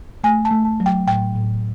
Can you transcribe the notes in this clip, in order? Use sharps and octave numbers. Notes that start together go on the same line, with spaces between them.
A3 G#5
A5
A3
A5
F#3
G5
A2 G5
A2